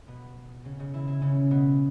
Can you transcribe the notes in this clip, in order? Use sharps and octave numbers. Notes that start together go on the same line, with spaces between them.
B2 B3
C#3 C#4
C#3 C#4
E3 E4
E3 E4
C#3 C#4
B2 B3